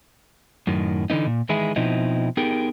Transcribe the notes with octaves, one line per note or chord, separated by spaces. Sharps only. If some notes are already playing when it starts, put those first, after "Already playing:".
F#2 A2 D#3
D3 E3 B3 D#4
A#2
D#3 E3 G#3 E4 G#4
B2 F3 C4 D#4 E4
B3 D#4 G4 G#4 A#4